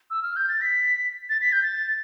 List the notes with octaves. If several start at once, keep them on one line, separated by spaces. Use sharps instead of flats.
E6
F6
G6
A6
B6
A6
B6
G6
A6